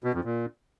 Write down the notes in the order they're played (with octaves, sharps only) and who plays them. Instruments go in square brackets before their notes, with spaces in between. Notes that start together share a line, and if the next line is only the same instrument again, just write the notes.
[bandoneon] B2
F2
A#2